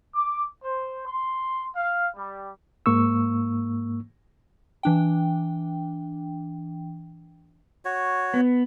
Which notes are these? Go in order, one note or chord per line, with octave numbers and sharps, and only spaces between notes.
D6
C5
C6
F5
G3
G#2 A#3 C#6 E6
E3 D4 G5
F#4 C#5
B3